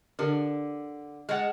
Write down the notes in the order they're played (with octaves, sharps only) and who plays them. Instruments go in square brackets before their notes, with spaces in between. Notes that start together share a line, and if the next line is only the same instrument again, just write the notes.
[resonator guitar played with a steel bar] D3 [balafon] D4 G4 A#4
[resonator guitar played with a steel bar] G#3 [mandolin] F#5 A5 F6